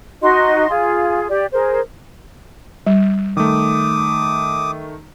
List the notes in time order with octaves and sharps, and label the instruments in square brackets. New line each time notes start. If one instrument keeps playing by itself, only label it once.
[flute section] D#4 F#4 D#5 C6
F4 G#4
G4 D5
G#4 A#4 C5
[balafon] G3
[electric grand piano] D#3 A3 [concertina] D6 D#6